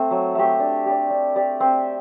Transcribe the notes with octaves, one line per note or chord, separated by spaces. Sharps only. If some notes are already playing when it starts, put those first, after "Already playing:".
Already playing: A3 C4
F#3
A3 C4 G4
D4
G4 D5
D4
G4 D5
C4